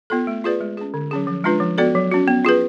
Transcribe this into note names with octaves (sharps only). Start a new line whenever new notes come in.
B3 F4 A4
A3
F4 G#4 B4 D5
G#3
C#4 G#4
D3
F#3 C#4 G#4
F3
G#3 D4 F4 B4
F3
B3 F#4 A4 D5
F#3
C#4 F#4
B3
F4 G#4 B4